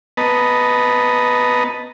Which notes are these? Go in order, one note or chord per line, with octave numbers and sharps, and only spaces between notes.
B3 B4 D#5 A5 A#5